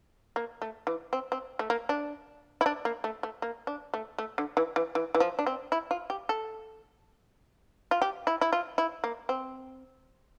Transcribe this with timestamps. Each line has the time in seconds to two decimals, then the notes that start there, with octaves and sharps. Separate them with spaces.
0.36 A#3
0.62 A3
0.87 E3
1.13 C4
1.32 C4
1.59 A3
1.70 A#3
1.89 D4
2.61 E4
2.66 D4
2.85 A#3
3.04 A3
3.23 A3
3.42 A#3
3.67 D4
3.94 A3
4.18 A3
4.38 D3
4.57 E3
4.76 E3
4.95 E3
5.15 E3
5.20 F3
5.39 D4
5.47 C4
5.72 E4
5.91 F4
6.10 G4
6.29 A4
7.91 F4
8.02 G4
8.27 E4
8.41 E4
8.53 F4
8.78 E4
9.04 A#3
9.29 C4